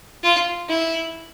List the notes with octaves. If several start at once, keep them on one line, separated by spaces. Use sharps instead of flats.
F4
E4